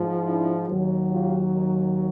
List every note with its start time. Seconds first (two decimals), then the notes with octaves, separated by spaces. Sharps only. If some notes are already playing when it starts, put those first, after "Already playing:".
Already playing: G#2 F3
0.26 D4 E4
0.68 D#2 D#3 F#3
1.11 F4 G4